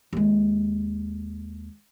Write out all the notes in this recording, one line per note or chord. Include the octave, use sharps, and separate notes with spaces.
D#2 G#3